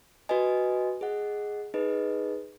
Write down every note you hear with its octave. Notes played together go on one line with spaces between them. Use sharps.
F#4 B4 D#5 G#5
G#4 D#5 F#5
D#4 G#4 B4 D#5